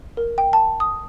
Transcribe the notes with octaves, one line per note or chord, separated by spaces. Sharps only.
A#4
G5
A5
D#6